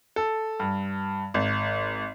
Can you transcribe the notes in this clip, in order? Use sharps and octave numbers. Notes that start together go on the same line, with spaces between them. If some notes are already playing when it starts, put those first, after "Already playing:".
A4
G2
G#1